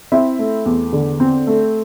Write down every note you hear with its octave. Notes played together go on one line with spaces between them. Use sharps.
C4 E4 E5
A3
E2
D3
C4
A3